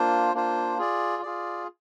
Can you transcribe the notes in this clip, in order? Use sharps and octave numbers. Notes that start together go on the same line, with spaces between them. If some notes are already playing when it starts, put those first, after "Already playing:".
Already playing: A#3 D4 F4 C5
A#3 D4 F4 C5
F4 G#4 D5
F4 G#4 D5